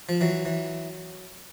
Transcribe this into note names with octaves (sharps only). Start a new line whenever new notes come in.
F3
E3 F#3
E3